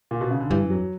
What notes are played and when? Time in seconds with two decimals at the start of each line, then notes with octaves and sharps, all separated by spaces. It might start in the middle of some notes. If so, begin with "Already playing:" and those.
0.11 A#2
0.21 B2
0.30 C#3
0.40 D3
0.50 G2 E3
0.64 F#2
0.70 F#3